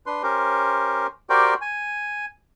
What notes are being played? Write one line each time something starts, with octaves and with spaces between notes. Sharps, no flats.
D4 B4 C6
C#4 G4 A#4 C5
F#4 G4 A#4 C5 D5 G5
G#5